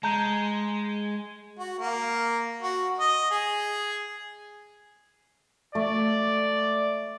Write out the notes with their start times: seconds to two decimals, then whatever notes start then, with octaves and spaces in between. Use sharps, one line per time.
0.03 G#3 A5 A#5 G6
1.59 F#4
1.79 A#3
2.62 F#4
2.99 D#5
3.31 G#4
5.75 A3 D5